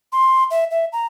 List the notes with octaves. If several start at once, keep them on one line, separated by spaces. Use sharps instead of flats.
C6
E5
E5
A#5